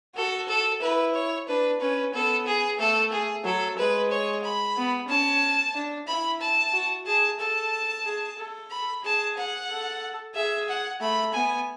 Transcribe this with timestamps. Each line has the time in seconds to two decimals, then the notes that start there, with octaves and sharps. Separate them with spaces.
0.16 F#4 A4
0.48 A4
0.81 E4 B4
1.14 C#5
1.48 D4 B4
1.80 C#4 B4
2.13 B3 A4
2.46 G#4
2.79 A3 A4
3.12 G#4
3.44 F#3 A4
3.78 G#3 B4
4.11 C#5
4.44 B5
4.77 B3
5.09 C#4 A5
5.75 D4
6.08 E4 B5
6.41 A5
6.73 F#4
7.06 G#4 A5
7.40 A4 A5
8.06 G#4
8.38 A4
8.71 B5
9.03 G#4 A5
9.37 F#5
9.70 A4
10.35 G#4 E5
10.69 F#5
11.01 A3 B5
11.34 B3 G#5